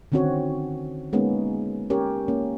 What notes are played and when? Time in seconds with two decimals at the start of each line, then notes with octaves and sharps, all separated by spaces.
0.12 D3 D#3 C4 C#4 F#4 C#5
1.13 G#3 A#3 B3 C#4 D#4
1.90 C#4 G4 A#4 C#5
2.28 A#3 C#4